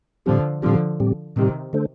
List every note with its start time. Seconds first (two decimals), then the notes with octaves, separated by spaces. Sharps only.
0.26 A2 D3 F3 G3 C4 G4
0.62 A2 D3 F3 G3 C4 G4
1.00 A2 G3 C4 G4
1.36 A2 C3 D#3 G3 C4 G4
1.73 D3 A3 D4 A4 C5